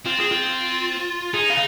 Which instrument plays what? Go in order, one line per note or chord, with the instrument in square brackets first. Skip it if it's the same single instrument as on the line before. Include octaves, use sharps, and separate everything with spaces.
[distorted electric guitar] C4 [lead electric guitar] F4
[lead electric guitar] G#4
F4
[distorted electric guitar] D#4 [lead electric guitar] G#4
[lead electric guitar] F5